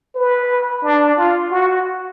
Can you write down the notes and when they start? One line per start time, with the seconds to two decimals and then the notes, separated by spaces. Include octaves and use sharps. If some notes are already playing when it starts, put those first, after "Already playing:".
0.15 B4
0.83 D4
1.18 F4
1.52 F#4